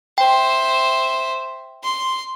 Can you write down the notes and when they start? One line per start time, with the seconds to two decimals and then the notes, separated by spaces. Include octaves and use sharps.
0.18 C5 E5 G5
1.83 C6